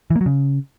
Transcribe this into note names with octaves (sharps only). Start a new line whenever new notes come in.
E3
A#3
F#3
C#3